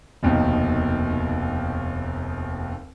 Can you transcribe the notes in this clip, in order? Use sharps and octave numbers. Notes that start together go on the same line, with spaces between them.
F1 D#2 B2 D#3